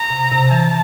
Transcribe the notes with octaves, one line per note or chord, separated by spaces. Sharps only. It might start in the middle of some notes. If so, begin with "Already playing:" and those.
Already playing: A#5
C3
C3
E3 A5